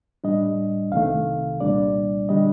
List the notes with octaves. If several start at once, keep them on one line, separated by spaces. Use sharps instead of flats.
A2 G3 D4 D#5
C2 C3 D#3 A3 F5
C2 A#2 G3 D4 D5
D3 G3 D4 D#5